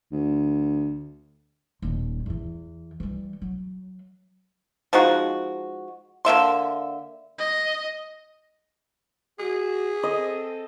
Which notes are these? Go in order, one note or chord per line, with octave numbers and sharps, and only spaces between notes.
D2
D#1 D#2
E2 E3
E3 G3
F#3
F3 G#3 D#4 F#4
D3 A#3 E5 C6
D#5
F#4 G#4
C4 A4 D#5